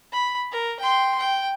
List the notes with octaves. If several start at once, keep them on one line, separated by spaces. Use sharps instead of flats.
B5
A#4
G5 C6
G5